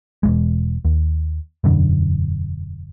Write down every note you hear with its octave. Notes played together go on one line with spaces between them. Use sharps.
E1 C2 G#3
D#2
E1 F#2 D3